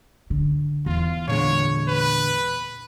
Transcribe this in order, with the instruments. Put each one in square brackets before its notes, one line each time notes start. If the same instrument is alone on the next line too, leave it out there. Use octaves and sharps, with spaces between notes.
[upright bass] D3
[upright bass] E2 [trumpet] F4
[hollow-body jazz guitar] A#2 D3 G#3 [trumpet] C#5
[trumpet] B4